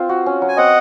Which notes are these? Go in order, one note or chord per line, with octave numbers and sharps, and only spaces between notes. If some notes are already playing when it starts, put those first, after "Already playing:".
Already playing: C4 F4
F#4
C#4
F#3
G#5
C4 D#5 F#5